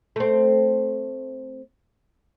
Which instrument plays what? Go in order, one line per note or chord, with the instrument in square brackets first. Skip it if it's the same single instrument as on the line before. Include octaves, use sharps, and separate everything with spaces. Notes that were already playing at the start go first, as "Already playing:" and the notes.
[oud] A3 C4